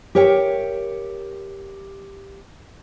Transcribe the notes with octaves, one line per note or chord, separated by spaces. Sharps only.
G4 A#4 C#5 E5 G5